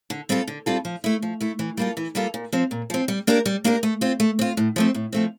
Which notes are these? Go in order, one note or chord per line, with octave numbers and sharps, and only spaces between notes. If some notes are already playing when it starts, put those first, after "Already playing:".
D3
G3 C4 F4 A4
D3
G3 C4 F4 A4
F3
A3 E4
F3
A3 E4
E3
G3 A#3 F4 A4
E3
G3 A#3 F4 A4
A#2
F3 C4
A#2
F3 C4
G3
A#3 D4 G4 A#4
G3
A#3 D4 G4 A#4
A3
C4 F4
A3
C4 F4
A2
F3 A3 C4
A2
F3 A3 C4